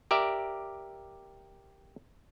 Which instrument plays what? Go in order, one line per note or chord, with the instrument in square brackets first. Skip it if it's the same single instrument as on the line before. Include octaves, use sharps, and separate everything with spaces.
[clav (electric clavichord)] G4 A#4 D5 E5